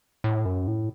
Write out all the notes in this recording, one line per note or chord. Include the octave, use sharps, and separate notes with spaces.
A2
F#2
A2